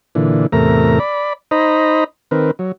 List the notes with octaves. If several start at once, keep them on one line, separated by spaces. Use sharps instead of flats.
A#2 D3 E3
E2 A2 C3 A3 A#4 A#5
D5 B5
D#4 C5 D#5 A#5 B5
D#3 C4 A#4 B4
F#3